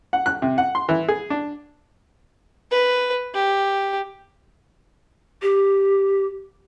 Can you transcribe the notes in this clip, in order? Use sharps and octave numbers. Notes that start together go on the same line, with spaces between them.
F#5
F#6
C3
F#5
C6
E3
G#4
D4
B4
G4
G4